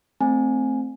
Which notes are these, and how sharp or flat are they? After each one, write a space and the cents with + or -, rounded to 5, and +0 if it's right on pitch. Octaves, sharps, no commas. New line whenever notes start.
A3 +0 C4 +0 G#5 +0